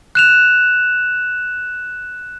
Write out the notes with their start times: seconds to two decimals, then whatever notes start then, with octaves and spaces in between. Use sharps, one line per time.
0.15 F#6 E7 F7